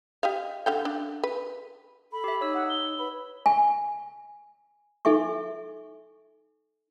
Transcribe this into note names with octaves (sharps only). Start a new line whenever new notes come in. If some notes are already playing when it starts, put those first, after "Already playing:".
G4 D#5 F5
D3 F5 G5
D4
B4
A4 B5
G4 E5
D#4 C#5 E6
F#5
G7
B4 B5
G#5
D#4 A4 E5 G#5 C#6